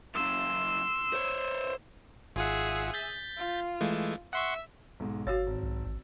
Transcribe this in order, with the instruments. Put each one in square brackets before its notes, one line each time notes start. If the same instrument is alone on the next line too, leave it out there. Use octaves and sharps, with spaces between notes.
[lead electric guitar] F#2 C#3 [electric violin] C6 E6
[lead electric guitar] C5 C#5
[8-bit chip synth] G#1 F4 F#5 [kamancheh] G#4 E5
[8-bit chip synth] G6 A6 B6
[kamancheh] F4
[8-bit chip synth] E3 G#3 A3
[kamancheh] E5 [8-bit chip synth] F#5 C6 C#6
[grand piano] B1 G#2
[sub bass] G1 [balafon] F#4 C#5 [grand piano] F5 E6 A6
[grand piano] G#1
[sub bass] B1
A1